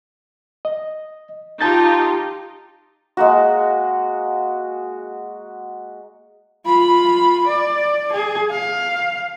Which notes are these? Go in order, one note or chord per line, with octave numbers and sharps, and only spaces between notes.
D#5
D#4 F4 G4 A5 G6 A6
G#3 A#3 F#4
F4 B5
D5
G#4
F5